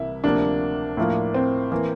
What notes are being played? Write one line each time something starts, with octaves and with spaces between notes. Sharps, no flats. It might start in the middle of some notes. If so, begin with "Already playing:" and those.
Already playing: C2 C3 E3 A#3 E4
D2 C3 F3 A#3 D4
A2 F3 A#3 F4
C4
E3 A#3